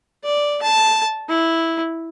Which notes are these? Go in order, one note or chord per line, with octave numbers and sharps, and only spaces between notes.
D5
A5
E4